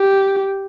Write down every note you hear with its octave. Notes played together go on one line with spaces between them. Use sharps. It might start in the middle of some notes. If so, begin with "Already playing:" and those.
Already playing: G4